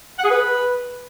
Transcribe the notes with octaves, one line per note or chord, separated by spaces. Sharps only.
F#5
G#4
B4